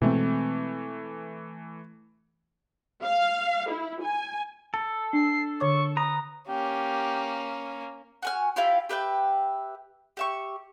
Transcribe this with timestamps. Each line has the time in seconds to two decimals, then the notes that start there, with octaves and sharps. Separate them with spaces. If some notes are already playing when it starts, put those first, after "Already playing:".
0.02 B2 E3 G#3 A3 C4
3.03 F5
3.70 E4
4.03 G#5
4.74 A4 A5
5.13 D4 C7
5.60 D3 C#5 C#6 D6
5.97 B4 A#5 D#6
6.48 A#3 C#4 G4
8.22 F#4 G#5 F6
8.56 E4 F4 G4 F5
8.89 G4 B4 E5 G5
10.17 G4 E5 C#6